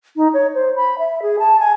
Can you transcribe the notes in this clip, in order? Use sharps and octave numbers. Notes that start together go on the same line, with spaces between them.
D#4
C#5
C5
B5
E5
G#4
A5
G#5